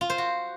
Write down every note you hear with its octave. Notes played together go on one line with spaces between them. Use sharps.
F4
C5
F#4